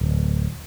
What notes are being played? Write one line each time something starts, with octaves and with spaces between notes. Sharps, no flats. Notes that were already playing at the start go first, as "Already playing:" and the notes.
D1